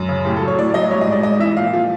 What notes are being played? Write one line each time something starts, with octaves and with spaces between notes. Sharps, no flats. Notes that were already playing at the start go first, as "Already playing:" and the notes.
Already playing: F#2
C#3
A2 G4
A4
F#3
C#5
A2 D5
D5
F#3 D#5
G3 C#5
D#5
G#2
D5
G#2 D#5
E3 E5
A#2 F5
F3